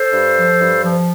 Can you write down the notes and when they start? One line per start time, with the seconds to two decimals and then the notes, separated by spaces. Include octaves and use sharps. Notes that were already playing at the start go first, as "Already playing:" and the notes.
Already playing: A4 C5
0.11 G2
0.36 F3
0.59 G2
0.83 F3